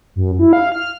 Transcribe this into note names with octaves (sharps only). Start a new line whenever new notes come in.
F#2
E4
F5
F6